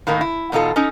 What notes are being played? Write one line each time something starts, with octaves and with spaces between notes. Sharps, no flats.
A2 D#3 A#3 D#4 E4
E4
E2 B2 D#4 F4 A4
C#4 D#4 A4 D#5